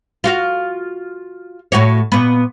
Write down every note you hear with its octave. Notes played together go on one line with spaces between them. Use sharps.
F4 F#4 F5
A2 F#4 C#5
A#2 B3